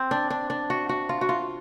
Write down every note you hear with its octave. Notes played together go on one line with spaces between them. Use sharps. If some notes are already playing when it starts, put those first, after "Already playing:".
Already playing: C4
D4
D4
D4
F#4
F#4
F4
F#4
F4